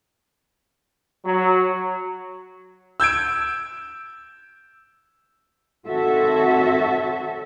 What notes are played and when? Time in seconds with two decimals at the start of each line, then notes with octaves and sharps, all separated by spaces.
1.25 F#3
3.00 E6 G6 G#6 D7
5.87 D#3 C4 F#4 A4 C#5 E5